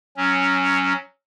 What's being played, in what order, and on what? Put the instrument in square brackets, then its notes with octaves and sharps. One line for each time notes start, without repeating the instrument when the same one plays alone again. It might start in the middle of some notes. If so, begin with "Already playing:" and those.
[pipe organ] F#3 C#4